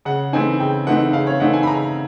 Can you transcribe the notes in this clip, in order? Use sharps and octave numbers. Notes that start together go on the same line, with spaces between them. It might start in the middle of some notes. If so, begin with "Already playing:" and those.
C#3 F#5
E3 A3 C4 D#4 G#5
C#3 G5
E3 A3 C4 D#4 F#5
C#3 F5
C#5
E3 A3 C4 D#4 F#5
G#5
B5
C#3 A#5